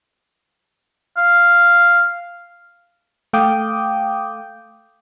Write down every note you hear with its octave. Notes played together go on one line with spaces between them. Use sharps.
F5
A3 F5 G5 D6 D#6 G6